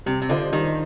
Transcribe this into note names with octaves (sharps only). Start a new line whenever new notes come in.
C3 G3
C3
D3 D4 F4 C5 D#5
D#3 G3